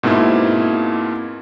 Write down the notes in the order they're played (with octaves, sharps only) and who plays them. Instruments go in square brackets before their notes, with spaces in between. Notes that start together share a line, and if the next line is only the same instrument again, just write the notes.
[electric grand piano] G#2 B2 A#3 C4 E4 F4